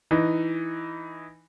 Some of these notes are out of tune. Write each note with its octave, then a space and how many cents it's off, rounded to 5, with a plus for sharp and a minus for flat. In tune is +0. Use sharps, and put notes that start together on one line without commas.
E3 +0 D#4 +0